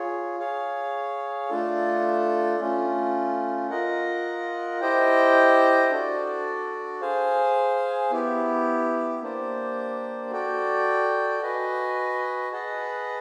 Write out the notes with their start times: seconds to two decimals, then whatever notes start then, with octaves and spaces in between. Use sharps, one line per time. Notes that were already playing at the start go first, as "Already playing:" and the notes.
Already playing: F4 G#4 C#5
0.40 G#4 C#5 F5
1.50 A3 D4 F4 A4
2.60 A3 C#4 F4
3.70 F4 A#4 D#5 F#5
4.81 E4 G4 C5 D#5 G5
5.91 D4 F#4 A4 D5
7.01 G#4 C5 F5 G#5
8.11 B3 E4 G4
9.21 A#3 D4 G4 C5
10.31 F#4 A4 D5 G5
11.42 F#4 B4 D#5 G#5
12.52 G#4 B4 D#5 F#5 A5